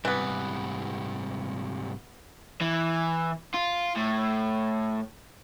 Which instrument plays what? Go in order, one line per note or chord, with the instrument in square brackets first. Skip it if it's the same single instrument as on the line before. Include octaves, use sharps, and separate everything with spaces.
[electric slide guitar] G#2 C3 G3 [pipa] E3 B3
[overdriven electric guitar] E3
F4
A2